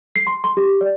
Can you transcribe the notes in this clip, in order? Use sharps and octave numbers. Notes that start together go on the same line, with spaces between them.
C7
C6
C6
G4
D5